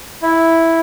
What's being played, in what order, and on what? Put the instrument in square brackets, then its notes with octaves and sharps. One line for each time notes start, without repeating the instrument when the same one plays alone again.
[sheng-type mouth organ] E4